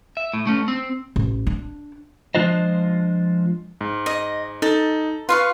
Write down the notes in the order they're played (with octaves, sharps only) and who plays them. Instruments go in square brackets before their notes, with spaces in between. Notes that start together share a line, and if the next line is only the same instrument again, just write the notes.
[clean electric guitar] E5
A2
A3 C#4
C4
[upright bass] A1
D4
[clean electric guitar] F3 G#3 D4 F4 C5 D#5
[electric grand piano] G#2
[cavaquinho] D#5
[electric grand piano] D#4 [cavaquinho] A4
[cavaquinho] F4 F5 C#6 [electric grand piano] B4